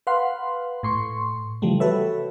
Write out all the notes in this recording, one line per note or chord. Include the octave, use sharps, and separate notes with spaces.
B4 F5 F#5 C6
A2 C6 C#6
C#3 E3 F3 G3 A3
F#4 G4 A4 B4 C#5 E5